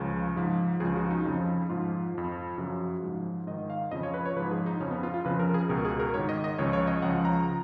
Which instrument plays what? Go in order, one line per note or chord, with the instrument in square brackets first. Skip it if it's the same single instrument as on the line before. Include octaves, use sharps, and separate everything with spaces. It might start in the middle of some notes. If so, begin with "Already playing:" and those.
Already playing: [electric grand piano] C#2 C#3 F3
G#2 F3
C#2 C#3 F3 G#4
F#4
D#4
F2 C#3 F3
G#2 F3 F4
F2 F3
F#2 C#3 F3 F#4
G#2 F3
G#2 D#5
D#3
F5
F2 C#3 F3 D#5
C#5
B4
C#5
F3 B4
G#2
G#4
D#4
F2 C#3 F3 C#4
B3
F4
F4
F2 C#3 F3 B4
A#4
G#4
C#2 B2 A#4
G#4
A#4
G#2 D#3 C#5
D#5
D#5
C#2 C#3 F3 C#5
C#5
D#5
C#2 C#3 F3 F#5
A#5